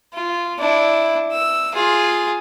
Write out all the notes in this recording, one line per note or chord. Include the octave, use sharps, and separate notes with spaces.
F4
D4 E4
E6
F4 G#4